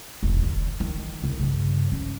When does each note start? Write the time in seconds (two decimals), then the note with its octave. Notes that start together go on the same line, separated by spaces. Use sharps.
0.23 E1 A1
0.43 D3
0.80 D#3
1.22 C2 C#3
1.39 G2 C#3
1.92 C#4